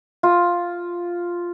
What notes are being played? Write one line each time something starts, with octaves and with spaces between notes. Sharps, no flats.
F4